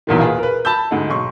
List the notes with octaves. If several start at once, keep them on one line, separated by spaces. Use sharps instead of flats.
B1 E2 A#2 D#3
F4 G#4 B4
A#4 B4
A5 B5 E6 G6
D2 G#2 G#3
B1 C6 C#6